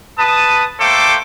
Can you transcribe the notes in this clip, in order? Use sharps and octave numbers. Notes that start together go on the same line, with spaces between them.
B4 A5 D#6
A3 A#3 A4 C5 G5 D6